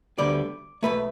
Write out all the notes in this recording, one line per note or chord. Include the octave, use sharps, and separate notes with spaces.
D2 D3 G3 B3 D5
B1 B2 A3 B4